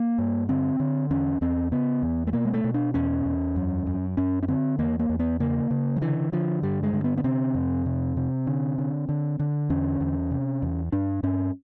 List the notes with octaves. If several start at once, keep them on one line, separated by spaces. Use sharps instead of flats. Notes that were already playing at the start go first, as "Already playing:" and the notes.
Already playing: A#3
G2
D3 C4
D3
E2 C#4
E2 C4
C#3 B3
E2
A3
B2 A#3
G#3
A3
B2
D4
E2 C#4
E2
F#2
F#2
F#2 C#4
C#4
D3 C4
E2 A#3
A#3
E2
B3
C#3 A#3
C#3
F3
D3 E3
D3 F3
G2 G3
G#3
D3
B3
B3
C3 C4
F2
C3
C3
D3
D3
D3
D3
E2 C#4
E2
C3
E2
G2 D4
G2 C#4